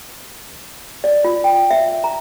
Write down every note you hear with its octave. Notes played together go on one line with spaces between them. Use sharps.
D5
F4
G5
E5
A#5